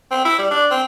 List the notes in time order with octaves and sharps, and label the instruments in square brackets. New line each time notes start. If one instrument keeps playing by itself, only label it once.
[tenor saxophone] C4
E4
G3
D4
C4